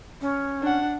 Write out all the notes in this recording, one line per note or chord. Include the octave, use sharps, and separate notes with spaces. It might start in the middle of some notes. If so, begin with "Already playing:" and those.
C#4
D4 F#5